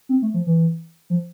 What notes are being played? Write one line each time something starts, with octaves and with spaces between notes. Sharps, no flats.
C4
A3
F3
E3
F3